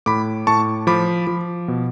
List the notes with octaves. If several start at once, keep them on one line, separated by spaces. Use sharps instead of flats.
A2 B5 D6
A2 A5 C#6
F3 B5 D6
F3
B2